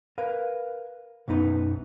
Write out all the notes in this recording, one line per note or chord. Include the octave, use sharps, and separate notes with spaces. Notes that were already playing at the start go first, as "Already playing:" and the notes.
A#4 B4 F5
B1 F#2 B3 D#4 B4